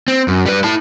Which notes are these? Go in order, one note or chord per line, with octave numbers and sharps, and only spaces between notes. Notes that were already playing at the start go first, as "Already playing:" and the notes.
C4
F#2
G3 B4
E4 A5